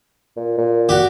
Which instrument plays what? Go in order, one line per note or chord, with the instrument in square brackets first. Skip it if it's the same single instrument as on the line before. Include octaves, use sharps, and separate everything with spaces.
[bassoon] A#2
A#2
[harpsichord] F#4 G4